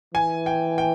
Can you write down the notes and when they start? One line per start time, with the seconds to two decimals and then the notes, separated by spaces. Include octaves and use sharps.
0.14 E3 G#5
0.46 G5
0.78 G5